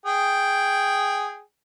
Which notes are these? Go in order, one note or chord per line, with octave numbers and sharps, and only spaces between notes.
G#4 G5